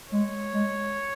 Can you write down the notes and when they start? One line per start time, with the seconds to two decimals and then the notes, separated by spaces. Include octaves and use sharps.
0.11 G#3 C#5
0.53 G#3